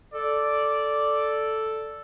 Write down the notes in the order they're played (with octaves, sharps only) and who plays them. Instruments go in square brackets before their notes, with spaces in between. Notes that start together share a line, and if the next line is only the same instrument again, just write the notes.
[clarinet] A4 [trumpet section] D5